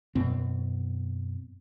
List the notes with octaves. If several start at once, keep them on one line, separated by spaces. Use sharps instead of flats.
F#2 B2 C4